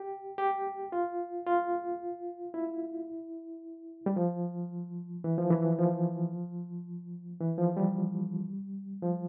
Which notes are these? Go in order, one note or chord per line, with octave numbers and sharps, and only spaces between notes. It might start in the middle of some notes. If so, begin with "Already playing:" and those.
Already playing: G4
G4
F4
F4
E4
G3
F3
E3
F3
E3
F3
E3
F3
G3
F3